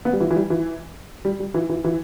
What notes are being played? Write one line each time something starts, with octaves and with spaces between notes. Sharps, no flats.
B3
G3
E3
E3
G3
E3
G3
G3
E3
E3
E3